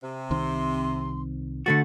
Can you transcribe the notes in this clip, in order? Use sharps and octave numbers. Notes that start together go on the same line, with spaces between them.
C3
C2 D#3 C4 C6
D3 A3 F#4 A6